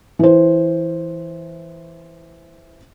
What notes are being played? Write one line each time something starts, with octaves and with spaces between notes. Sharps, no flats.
E3 C5